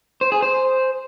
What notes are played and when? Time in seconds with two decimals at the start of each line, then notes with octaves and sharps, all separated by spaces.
0.21 C5
0.32 G#4
0.42 C5